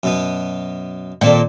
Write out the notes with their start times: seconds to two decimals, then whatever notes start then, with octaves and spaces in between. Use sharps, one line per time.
0.03 F#2 B2 B3
1.21 A#2 D#3 C4 A4